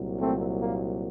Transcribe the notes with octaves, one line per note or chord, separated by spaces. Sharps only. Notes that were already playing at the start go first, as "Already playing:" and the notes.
Already playing: C2 A#2 F#3
A3 C4
A#3